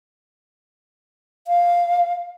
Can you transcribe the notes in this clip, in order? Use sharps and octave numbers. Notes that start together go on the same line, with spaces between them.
F5